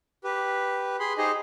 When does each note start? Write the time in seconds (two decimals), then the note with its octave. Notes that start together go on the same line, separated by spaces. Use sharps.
0.24 G4 B4
1.00 G#4 B5 C6
1.18 D#4 G4 G#4 C5 D#5